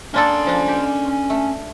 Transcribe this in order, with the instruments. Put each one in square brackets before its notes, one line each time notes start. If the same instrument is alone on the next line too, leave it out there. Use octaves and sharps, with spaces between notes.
[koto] A#3 D4 A4 [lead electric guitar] C#4 C6
[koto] F3 D4
G4
A3